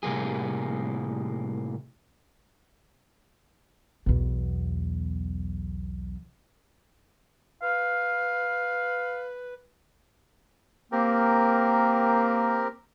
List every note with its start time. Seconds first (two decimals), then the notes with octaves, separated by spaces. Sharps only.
0.03 A2 C3 G3 A#3 G#4
4.06 B1 E2
7.62 B4 F5
10.92 A#3 C4 G4 A#4